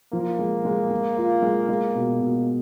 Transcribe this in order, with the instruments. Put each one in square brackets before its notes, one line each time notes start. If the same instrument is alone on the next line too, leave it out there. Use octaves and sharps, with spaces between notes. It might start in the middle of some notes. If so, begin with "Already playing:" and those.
[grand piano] F3 [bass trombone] A#3
[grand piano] G#3
G#3
G#3
F4
G#3
G#3
B2
B2